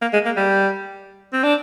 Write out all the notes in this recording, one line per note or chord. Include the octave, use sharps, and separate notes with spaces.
A#3
G#3
A#3
G3
C4
D4